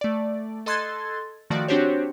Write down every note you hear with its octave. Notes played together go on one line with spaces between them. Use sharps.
A3 D5
A4 D#5 C6 F#6 G#6 A6
D#3 F3 A3 F#4 D5
C4 D4 F#4 G4 C5 C#5